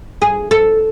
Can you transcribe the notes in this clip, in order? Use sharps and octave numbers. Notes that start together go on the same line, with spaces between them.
G#4
A4